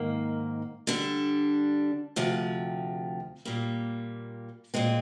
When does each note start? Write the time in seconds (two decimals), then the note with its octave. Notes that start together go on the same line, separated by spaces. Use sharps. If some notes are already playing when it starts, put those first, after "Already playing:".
Already playing: G#2 D#3 A#3
0.87 D3 G3 D4
2.16 D2 C3 F3
3.45 A#2 G3 A#3
4.74 A#2 G#3 C4